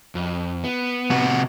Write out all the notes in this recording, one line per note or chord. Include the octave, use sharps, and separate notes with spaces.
F2
B3
C3 F#4